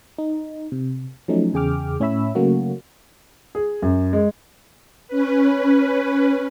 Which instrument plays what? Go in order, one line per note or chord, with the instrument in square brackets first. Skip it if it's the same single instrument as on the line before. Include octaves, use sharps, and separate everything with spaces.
[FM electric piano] D#4
C3
F3 F#3 A3 C#4 D#4
E2 C#3 G#4 G5 D6 F6
A2 C#4 C#5 E5 B5 E6
C#3 F#3 A3 A#3 C#4 F#4
[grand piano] G#4
F#2
G#3
[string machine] C#4 B4